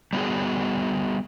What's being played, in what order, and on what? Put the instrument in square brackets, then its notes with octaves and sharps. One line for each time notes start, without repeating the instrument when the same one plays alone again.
[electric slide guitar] G3 B3 F#4 G#4